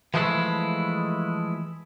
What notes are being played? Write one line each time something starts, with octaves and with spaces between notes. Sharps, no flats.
E3 F3 G#3 A3 E4